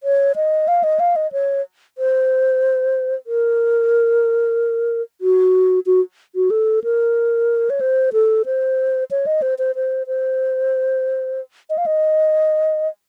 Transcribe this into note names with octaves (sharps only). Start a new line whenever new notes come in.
C#5
D#5
F5
D#5
F5
D#5
C#5
C5
A#4
F#4
F#4
F#4
A4
A#4
C#5
C5
A4
C5
C#5
D#5
C5
C5
C5
C5
D#5
F5
D#5